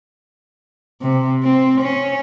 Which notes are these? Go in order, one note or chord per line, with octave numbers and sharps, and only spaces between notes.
C3
C4
C#4